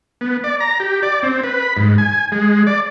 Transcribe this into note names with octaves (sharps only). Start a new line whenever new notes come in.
B3
D5
A#5
G4
D5
C4
B4
B5
G#2
G#5
G#3
D5